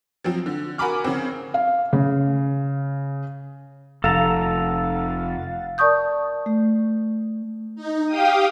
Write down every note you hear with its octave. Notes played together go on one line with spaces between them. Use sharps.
F3 F#3 C4
D3
F#4 A#4 G#5 B5 D6 F6
C#3 C4
F5
C#3
F1 A4 F5 F#5 A#5 A6
A#4 D5 A5 C#6 D#6 G6
A3
D#4
G4 F5 G5 D#6